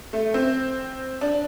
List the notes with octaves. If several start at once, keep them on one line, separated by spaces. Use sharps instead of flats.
A3
C4
D4